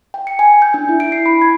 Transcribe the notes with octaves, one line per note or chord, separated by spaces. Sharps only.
G5
C#7
G#5
G6
D4
E4
D7
C7
B5
G#6